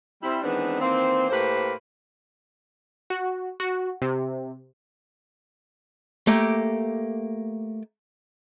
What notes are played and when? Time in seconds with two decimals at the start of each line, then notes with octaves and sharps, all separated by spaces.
0.22 G3 C4 E4
0.42 D#3 E3 G#3 B3 C4 D4
0.79 D#3 E3 A#3 C4
1.29 A2 A#3 G4 B4 C5
3.10 F#4
3.60 F#4
4.02 C3
6.27 A3 A#3 G4